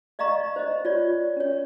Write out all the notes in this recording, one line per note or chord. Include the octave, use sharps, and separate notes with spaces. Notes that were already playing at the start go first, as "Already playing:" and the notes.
D5 D#5 F5 A#5 C#6
C5 D#5
F4 C#5 D5
C#4 C#5